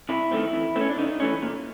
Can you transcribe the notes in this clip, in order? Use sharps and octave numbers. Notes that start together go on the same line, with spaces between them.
C3 E4
D#3 F#3 A3 C4
E3
A3 C4
C#4
D4
C#3 D#4
E3 A3 C#4
A#2